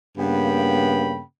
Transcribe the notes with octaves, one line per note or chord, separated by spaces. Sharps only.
G2 C#3 A#3 B3 G5 B5